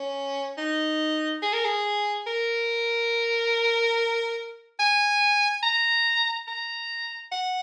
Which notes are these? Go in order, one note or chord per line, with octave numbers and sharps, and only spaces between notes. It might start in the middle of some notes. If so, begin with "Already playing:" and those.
Already playing: C#4
D#4
G#4
A#4
G#4
A#4
G#5
A#5
A#5
F#5